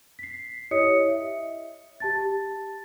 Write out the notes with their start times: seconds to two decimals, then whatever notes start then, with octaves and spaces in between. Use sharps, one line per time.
0.19 B6 C7
0.71 E4 G4 C#5 D#5 D#6 C#7
1.08 E5
2.00 G4 A5 A6